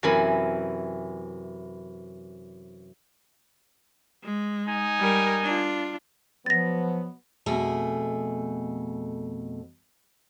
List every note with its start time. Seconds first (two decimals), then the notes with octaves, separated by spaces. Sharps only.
0.03 F#2 C3 E3 E4 G#5 B5
4.23 G#3
4.67 D#4 G#5
4.99 G3 A#4
5.44 D4 F4
6.46 B2 F3 F#3 B3 A6 A#6
7.46 F2 B2 A3 G#4